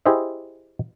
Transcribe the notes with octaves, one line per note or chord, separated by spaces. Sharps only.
E4 G4 G#4 C5 D#5 E5